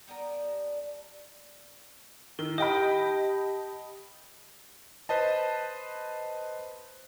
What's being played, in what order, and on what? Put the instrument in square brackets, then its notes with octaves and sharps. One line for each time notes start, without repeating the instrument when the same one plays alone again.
[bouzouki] G3 B3 D4 A#4
[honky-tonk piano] D#3 [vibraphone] E4
[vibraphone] G4 A5 [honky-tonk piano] D#5 G5 B5
[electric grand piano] B4 C5 D#5 A5